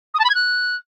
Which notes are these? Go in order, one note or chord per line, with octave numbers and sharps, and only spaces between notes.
D#6
A5
B5
G#6
F#6